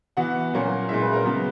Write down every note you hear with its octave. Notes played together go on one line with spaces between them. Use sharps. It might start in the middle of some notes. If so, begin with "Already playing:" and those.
E3 B3 F#4 F#5
A#2 F#3 A#3 C#4
A#2 G#3 C#4 E4 E5
B4
A#4
C#3 F#3 B3